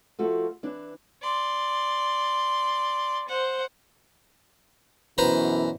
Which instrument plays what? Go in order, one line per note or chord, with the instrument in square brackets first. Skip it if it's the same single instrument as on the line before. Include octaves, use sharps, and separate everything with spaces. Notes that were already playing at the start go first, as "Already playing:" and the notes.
[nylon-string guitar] F3 A3 F#4
E3 D4
[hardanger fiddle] D5 C6
C5 F#5
[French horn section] F#2 B2 E3 [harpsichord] B4 C5 A#5